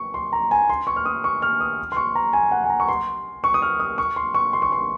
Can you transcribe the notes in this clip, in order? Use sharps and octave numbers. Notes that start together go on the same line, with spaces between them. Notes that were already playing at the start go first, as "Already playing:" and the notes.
Already playing: C#6
C6
A#5
G#5
C6
C#6
F6
D#6
C#6
F6
D#6
C6
C#6
A#5
G#5
F#5
G#5
A#5
C#6
C6
C#6
D#6
F6
D#6
C#6
C6
C#6
C6
C#6
C6